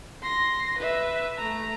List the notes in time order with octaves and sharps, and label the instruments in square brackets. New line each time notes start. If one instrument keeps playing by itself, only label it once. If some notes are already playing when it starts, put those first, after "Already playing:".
[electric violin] C6 A#6
B4 E5
A3 A#5